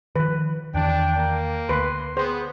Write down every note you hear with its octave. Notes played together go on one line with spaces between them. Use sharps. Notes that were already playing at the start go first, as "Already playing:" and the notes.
D#3 F3 B4
E2 D#3 E3 D4 G5
A#3
D2 B4 C6
B3 G#4 C5